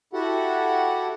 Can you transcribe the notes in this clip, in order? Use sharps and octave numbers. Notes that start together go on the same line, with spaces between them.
E4 F#4 G4 A4 F#5